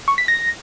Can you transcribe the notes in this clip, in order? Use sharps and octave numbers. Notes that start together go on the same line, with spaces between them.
C#6
B6
A#6